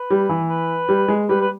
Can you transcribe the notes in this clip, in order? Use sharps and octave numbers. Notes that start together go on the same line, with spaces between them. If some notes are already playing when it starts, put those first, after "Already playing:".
Already playing: B4
G3
E3
B4
G3
G#3
G3 B4
B4